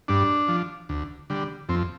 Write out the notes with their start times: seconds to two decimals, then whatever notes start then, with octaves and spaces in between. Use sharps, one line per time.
0.08 G2 D4
0.48 F3
0.89 D2
1.30 D3 G3
1.69 F2 C4